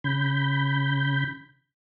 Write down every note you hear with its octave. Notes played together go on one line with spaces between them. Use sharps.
C#3 B5 G6